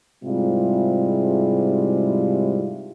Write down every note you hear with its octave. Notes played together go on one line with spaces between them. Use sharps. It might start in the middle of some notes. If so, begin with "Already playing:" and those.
G#2 C3 G3 G#3 E4 F4